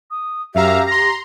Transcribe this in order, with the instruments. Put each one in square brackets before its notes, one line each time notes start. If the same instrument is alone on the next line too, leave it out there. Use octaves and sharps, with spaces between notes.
[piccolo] D#6
[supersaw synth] F#2 F5 A#5 [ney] G4 [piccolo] E5
[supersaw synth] A#5 C6 [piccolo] A#6